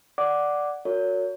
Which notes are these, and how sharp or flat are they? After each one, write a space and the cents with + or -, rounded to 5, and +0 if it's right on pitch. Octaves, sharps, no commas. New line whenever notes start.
D5 +0 F#5 +0 D6 +0
F#4 -15 A#4 -30 C#5 +30